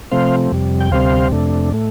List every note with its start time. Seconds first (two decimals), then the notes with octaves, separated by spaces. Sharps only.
0.11 C3 F3 A3 C4 C5 F5
0.52 F2 C3 G3
0.80 G5
0.92 D2 C3 G3 C4 C5 F5
1.32 F2 C3 A3 D4
1.72 A2 A3